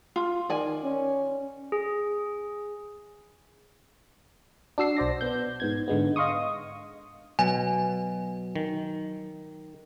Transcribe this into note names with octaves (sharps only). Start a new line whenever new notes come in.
F4
D#3 D5 G#5
C#4
G#4
D4 F#4 E6 C7
B1 C5 D5 A#6
B3 G6
G#2 B3 G#6
G#2 D3 G#3 B3
D#5 F5 C6 C#6 D#6
B2 F#3 G#5
D#3